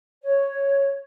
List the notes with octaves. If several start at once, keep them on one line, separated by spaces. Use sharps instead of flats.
C#5